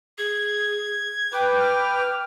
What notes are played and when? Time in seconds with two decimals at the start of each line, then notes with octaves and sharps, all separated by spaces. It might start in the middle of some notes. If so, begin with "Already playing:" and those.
0.18 G#4 G#6
1.32 B4 G5 D6
1.59 F6